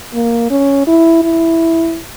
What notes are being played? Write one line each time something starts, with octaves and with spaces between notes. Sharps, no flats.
A#3
C#4
E4
E4